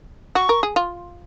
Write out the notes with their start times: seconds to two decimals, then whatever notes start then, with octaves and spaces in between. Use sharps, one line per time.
0.35 F#4 C#6
0.49 A#4
0.63 G#4
0.76 F4